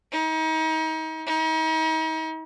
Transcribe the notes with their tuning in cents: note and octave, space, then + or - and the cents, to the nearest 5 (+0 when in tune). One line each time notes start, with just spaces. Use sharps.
D#4 +35
D#4 +40